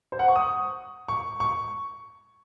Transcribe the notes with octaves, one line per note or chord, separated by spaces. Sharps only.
C5
F#5
C#6
D#6
C#6
C#6